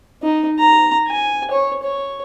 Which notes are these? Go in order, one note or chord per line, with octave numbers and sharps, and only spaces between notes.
D#4
A#5
G#5
C#5
C#5